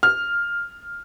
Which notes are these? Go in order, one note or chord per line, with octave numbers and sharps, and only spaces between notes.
F6